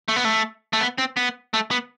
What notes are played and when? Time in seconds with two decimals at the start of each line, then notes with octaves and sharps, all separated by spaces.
0.08 A3
0.16 B3
0.25 A3
0.73 A3
0.81 B3
0.98 C4
1.17 B3
1.54 A3
1.71 B3